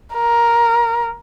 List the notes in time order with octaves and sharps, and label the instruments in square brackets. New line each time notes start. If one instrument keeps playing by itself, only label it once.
[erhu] A#4